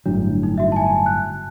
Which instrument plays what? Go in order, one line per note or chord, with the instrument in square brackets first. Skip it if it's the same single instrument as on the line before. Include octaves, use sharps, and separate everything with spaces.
[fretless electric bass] G1 A2 F#3 [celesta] D4
[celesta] D#4
F#4 E5
G#5 A5
F#6